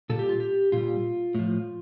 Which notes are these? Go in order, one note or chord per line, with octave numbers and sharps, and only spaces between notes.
A#2 G3 A4
G4
F4
G4
A#2 G3 F4
A2 F3